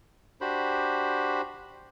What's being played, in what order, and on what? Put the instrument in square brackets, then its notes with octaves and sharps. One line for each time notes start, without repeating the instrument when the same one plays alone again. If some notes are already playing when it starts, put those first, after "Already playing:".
[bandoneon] D4 F#4 G4 C5 B5